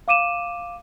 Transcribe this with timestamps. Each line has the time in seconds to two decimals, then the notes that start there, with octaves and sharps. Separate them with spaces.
0.08 F5 D6 D#7 E7